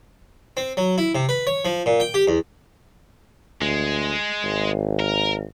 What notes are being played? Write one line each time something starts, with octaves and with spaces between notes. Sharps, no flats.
C4
F#3
E4
C3
B4
C#5
F3
A#2
G5
G4
E2
D2 G#3
G#1
A#4